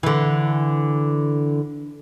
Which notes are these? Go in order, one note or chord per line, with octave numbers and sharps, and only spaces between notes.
D3 E3